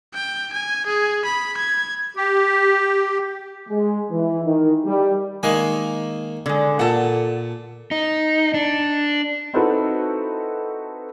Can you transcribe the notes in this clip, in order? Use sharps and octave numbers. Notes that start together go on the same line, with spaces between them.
G5
G#5
G#4
B5
G#6
G4
G#3
E3
D#3
G3
D#3 G#3 A#3 G#5
D3 G#3
A#2 A4 F#5
D#4
D4
C4 D#4 E4 F#4 A4 B4